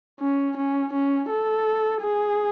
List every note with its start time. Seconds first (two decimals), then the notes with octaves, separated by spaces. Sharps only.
0.20 C#4
0.57 C#4
0.93 C#4
1.30 A4
2.02 G#4